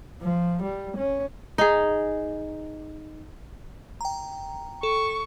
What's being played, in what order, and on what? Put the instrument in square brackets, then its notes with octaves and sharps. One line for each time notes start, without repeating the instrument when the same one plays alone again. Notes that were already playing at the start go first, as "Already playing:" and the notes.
[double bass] F3
G3
C#4
[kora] D#4 G#4
[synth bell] G5 A#5
[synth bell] A4 [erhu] C#6